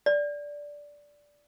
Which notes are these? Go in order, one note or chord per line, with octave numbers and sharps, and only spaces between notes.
D5